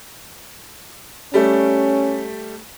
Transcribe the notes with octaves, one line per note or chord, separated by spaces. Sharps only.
G3 A3 C#4